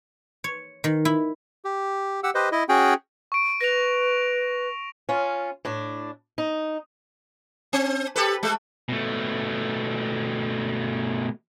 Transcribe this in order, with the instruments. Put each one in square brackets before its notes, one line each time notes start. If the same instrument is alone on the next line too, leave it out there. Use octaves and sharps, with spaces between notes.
[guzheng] C#5
D#3
E4
[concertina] G4
G4 F#5 E6
G4 B4 C5 D#5
E4 D#5
C#4 F#4 G#4 G5
[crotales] C#6 D7
[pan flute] B4 [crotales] A#6 F7
[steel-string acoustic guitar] C#4 F4
A2 D4
D#4
[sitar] C4
G4 A4 B4
G#3 A3
[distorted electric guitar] B2 A3